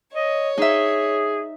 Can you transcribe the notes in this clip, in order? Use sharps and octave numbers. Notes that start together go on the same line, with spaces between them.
C#5 D#5
D#4 G#4 E5